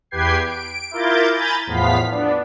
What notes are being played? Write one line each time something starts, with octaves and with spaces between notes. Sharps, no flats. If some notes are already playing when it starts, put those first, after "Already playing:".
E2 G4 B4 G5 G#6 C7
D7
E4 F4 A#4 D6 G6 A6
G#5 A#5 B5 G6 A6
E2 A2 F3 B3 F5 B6
B3 D4